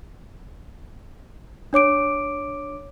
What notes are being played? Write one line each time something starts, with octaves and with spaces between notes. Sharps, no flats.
D4 C#5 D6 D7